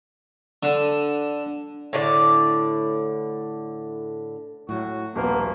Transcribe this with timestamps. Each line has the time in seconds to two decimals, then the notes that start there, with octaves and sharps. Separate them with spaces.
0.63 D3
1.93 A2 D3 D5
4.69 A2 F#3 F#4
5.16 D#1 A#1 B2 A#3 B3